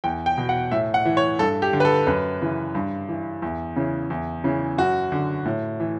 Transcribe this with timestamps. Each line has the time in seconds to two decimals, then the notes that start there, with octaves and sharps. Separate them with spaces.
0.04 E2 G5
0.26 G5
0.38 B2
0.49 F#5
0.71 A2 E5
0.94 F#5
1.05 E3
1.17 C#5
1.39 G2 A4
1.62 G4
1.73 D3
1.80 B4
1.85 A4
2.07 F#2 B4
2.41 C#3 E3
2.75 G2
3.09 E3
3.42 E2
3.76 C#3 E3
4.10 E2
4.44 C#3 E3
4.78 F#2 F#4
5.12 D3
5.46 A2
5.80 E3